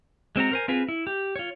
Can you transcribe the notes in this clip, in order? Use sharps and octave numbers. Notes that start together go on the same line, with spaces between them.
G#3 C4 F#4 A#5
A#4 C5 G#5
C4 F4 G#4 B4
E4
G4
F4 C#5